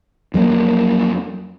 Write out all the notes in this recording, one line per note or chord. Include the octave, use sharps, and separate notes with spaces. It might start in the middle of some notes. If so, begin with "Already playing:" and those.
F2 F#3 G3 A#3